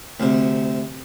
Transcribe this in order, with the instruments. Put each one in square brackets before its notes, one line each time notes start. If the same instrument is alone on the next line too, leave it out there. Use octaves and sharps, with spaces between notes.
[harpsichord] D2 C3